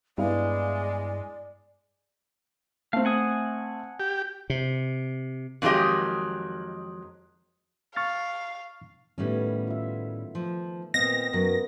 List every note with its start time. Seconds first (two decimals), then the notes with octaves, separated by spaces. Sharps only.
0.18 G2 G#3 B3 E4 D5 F5
2.93 A3 C4 F5
3.05 F#5 G#5 D#6
4.00 G4
4.50 C3
5.62 F2 D#3 F#3 G#3 G4 D#5
7.96 F5 C#6 F6 A6
9.18 A2 D#3 G3 A3 B3 C#4
9.67 F4 E5
10.35 F3
10.94 A#2 B3 C4 D#5 F5 A#6
11.33 F#2 F#3 B3